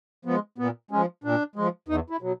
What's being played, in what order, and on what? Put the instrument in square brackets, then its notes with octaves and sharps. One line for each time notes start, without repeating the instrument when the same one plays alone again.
[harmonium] F3 G#3 B3
A#2 B3
F3 G#3 C#4
A#2 D4
F3 G#3
E2 D#4
E4
B2 F#3